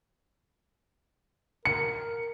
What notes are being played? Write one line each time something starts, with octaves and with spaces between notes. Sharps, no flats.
A#4 C#7